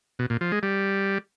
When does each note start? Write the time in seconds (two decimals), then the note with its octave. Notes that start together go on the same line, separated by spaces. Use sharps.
0.19 B2
0.30 A#2
0.41 F3
0.52 G#3
0.63 G3